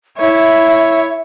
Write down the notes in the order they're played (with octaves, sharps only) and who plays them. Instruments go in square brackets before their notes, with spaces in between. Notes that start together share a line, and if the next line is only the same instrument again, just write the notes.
[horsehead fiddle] E4 C#5 [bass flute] E5